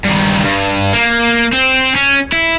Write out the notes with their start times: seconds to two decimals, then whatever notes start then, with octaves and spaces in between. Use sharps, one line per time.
0.05 G2 D#3
0.45 G2
0.93 A#3
1.53 C4
1.95 C#4
2.32 E4